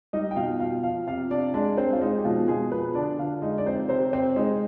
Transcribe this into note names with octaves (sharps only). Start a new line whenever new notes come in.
G3 D#4 D#5
G5
B2 F4 F5
B2 F4 F5
F3 F4 F5
C3 F4 F5
C3 D4 D5
G#3 D4 D5
G#3 C4 C5
F4
G#3 D#4
G4
B2 F3 F4
B2 G#3 G#4
F3 B3 B4
D3 D4 D5
D3 F4 F5
G#3 D#4 D#5
D5
F3 C4 C5
C3 C4 C5
C3 C4 C5
G#3 D#4